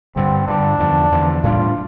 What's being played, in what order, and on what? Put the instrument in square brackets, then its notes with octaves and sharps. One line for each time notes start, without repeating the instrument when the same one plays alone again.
[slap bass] G2 D3 G3 [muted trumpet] C4
[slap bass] G2 D3 G3 [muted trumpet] D4
[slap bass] E2 D3 F3
E2 D3 F3
[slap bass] A2 G3 B3 D4 [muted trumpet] F4